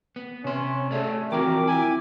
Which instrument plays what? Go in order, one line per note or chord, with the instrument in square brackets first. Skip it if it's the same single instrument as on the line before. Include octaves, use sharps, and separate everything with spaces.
[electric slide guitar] B3
[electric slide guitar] C3 C5 [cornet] C#4
[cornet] A3 [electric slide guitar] G#4 C#5 D5
[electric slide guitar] E3 F3 F#4 [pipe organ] C4 G5 D6 [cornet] A#4
[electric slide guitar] E4 [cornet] G#5